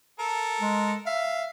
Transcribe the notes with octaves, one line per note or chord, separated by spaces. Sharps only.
A4 A#4
G#3
E5 F5